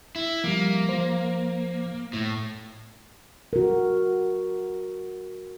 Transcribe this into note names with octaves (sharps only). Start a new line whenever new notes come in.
E4
F3 G3 A#3
F3 C5
A2
F#4 A#4